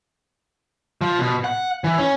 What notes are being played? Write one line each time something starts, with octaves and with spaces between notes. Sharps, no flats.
F3
B2
F#5
E3
C#4